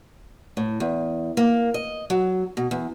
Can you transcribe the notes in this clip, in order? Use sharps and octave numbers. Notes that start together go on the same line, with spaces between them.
A2
E2
A#3
D#5
F#3
B2
E2